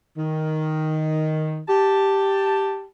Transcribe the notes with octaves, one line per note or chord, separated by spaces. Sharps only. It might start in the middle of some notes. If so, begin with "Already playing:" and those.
D#3
G4 A5